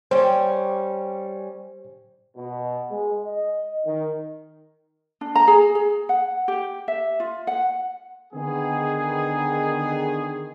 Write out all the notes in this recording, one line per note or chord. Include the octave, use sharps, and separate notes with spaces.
G3 C#4 C5
B2
G#3
D#5
D#3
D4
A#5
G#4
G#4
F#5
G4
E5
F4
F#5
D3 D#3 B3 G#4